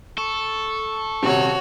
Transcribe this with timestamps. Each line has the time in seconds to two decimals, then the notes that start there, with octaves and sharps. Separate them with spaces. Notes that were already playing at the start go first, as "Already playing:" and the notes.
0.18 A4 C#6
1.23 D#1 C3 F#4 C#5